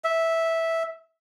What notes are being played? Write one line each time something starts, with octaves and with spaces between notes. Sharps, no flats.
E5